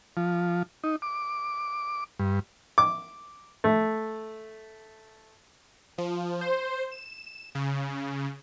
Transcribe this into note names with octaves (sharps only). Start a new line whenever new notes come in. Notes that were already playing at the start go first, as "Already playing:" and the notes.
F3
D#4
D6
G2
D6
A3
F3
C5
E7
C#3